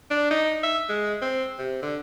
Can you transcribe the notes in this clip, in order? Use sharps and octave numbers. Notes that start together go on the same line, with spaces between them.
D4
D#4
E5
G#3
C4
C3
D3